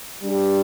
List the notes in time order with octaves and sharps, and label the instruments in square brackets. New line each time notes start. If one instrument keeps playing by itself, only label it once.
[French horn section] G3 D4 G4